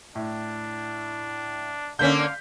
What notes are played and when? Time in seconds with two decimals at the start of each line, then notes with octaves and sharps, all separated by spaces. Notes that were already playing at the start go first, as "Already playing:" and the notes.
0.15 A2 D4
1.99 D3 A#3 C#4 F5 G6 B6